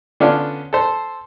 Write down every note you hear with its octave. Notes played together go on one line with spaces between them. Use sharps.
D3 B3 C#4 D4 F4
A4 C5